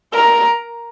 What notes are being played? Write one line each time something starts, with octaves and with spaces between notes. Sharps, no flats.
A#4